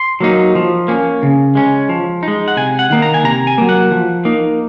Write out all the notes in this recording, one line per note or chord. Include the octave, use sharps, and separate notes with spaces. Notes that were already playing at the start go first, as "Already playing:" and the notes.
Already playing: C6
F#3 A#3 D#4
F3
A#3 C#4
C#3
G#3 C#4
F3
D#4
G#3
F#5
C3 G#5
F#5
D#3 A#3 D#4
A#5
G#5
C3 A#5
G#5
F#3 A#3
F#5
F3
A#3 D#4